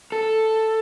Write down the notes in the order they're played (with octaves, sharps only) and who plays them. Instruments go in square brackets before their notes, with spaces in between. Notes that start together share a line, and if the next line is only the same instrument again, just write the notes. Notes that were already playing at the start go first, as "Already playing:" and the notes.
[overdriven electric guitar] A4